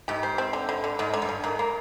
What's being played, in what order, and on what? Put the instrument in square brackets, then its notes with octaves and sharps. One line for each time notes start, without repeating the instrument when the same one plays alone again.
[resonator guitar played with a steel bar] G#2 [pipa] G4
[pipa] C5
C4
D3
D3
D3
[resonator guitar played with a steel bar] G#2 [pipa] D3
[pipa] D3
[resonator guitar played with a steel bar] G2
[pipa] D3
[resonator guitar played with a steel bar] G#2 [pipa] A#3
[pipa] A#3